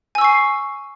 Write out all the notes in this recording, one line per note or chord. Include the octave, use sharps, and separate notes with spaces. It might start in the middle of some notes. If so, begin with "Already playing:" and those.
G#5 C#6 E6 C7